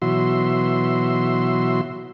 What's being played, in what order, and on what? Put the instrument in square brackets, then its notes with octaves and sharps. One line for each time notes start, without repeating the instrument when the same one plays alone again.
[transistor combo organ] B2 E3 F#3 F#4 E5 C6